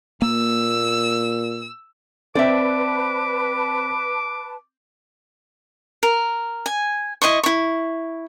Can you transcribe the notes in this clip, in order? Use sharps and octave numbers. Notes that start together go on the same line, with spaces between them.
A#2 A#3 E6
C4 B4 D5 E5 A5 D6
A#4
G#5
E4 D#5 C6 C#6
E4 C#6